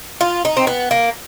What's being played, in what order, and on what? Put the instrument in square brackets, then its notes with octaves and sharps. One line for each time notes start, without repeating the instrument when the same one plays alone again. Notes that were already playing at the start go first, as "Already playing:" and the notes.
[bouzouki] F4
D#4
C4
B3
A#3